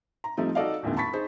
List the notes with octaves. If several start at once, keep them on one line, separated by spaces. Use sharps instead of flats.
A#5
F3 G3 A3 C4 D#4
D#4 F#4 A4 D5 D#5 F5
D#1 A#1 F2 G#2 D3
A5 B5 C#6 A6 B6
D#4 G#4 C5